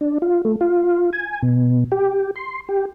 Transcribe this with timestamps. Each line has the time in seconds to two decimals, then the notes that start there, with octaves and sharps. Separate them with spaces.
0.01 D4
0.22 F4
0.45 A3
0.61 F4
1.13 G#5
1.42 B2
1.92 G4
2.36 C6
2.69 G4